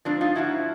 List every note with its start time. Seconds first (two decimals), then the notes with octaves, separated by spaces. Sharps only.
0.05 G#2 F3 C4 D4
0.21 D#4 F4
0.35 G#2 F3 E4 F#4